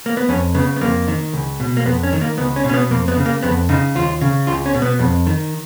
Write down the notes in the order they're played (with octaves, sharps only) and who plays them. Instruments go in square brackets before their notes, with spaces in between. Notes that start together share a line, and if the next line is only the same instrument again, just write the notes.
[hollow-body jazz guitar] A#3
B3
F2 C#4
C#3 B3
B3
F2 A#3
D#3
C#2
B2
A#3
F2 B3
C#4
D#3
A#3
C#2 B3
C#4
B2
C#4
B3
F2 A#3
B3
C#3
A#3
F2 B3
C#3 D#4
D#2 F4
C#3
C#2 F4
C#4
B2
B3
F2
D#3